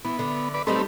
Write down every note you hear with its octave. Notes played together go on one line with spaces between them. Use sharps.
E3 B3
D3
B4 D5
G3 A3 C4 D#4 A4 B4